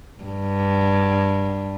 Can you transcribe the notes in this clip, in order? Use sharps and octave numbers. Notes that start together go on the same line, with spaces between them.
G2